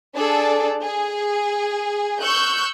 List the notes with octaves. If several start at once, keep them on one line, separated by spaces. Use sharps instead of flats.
D4 G#4 A4 D5
G#4
C#6 E6 F#6 G6